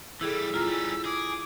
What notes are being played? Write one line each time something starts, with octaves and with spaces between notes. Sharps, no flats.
E3 G3 E4 G#4 A4 E6
F#2 A#2 F4 A#5 F6
G3 C#4 E4
G#4 D6